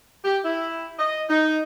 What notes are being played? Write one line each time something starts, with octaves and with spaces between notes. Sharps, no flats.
G4
E4
D#5
D#4